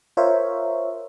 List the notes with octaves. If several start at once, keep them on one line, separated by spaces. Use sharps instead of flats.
F4 A#4 C5 C#5 E5